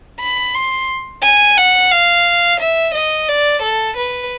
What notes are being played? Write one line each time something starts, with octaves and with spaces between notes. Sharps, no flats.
B5
C6
G#5
F#5
F5
E5
D#5
D5
A4
B4